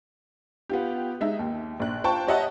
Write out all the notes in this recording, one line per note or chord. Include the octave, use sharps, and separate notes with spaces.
B3 F4 G4
G#3 D#4 E5
D#2
A#1 F#6
F4 C5 G5 A5 C#6
G4 C#5 D#5 E5 F#5 A5